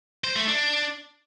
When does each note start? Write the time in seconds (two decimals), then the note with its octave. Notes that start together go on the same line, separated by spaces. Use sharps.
0.24 C5
0.36 A3
0.47 D4